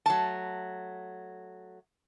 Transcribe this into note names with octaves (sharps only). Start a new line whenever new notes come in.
F#3 A3 A5